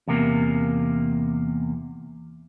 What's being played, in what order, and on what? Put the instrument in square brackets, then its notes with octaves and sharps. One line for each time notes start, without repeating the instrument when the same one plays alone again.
[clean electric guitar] E2 C3 A#3